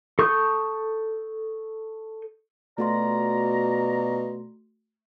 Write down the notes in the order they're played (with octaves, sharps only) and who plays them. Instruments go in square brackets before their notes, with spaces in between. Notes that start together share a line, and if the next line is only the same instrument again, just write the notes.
[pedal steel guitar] A4 C#6 D#6 G6
[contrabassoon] B2 [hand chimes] A3 F#4 C6 [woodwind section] F4 D5 A#5